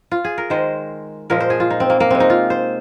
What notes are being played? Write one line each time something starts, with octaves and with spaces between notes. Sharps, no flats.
F4
G#4
A#4
D#3 G#3 C5
A#2 F3 G#3 A#4
C5
G#4
F4
D#4
C4
A#3
A#3
C3 G#3 C4
D#4
F4
C5